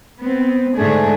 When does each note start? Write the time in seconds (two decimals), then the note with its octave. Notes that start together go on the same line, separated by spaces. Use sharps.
0.21 B3 C4
0.76 G#2 D3 A3 D4 G#4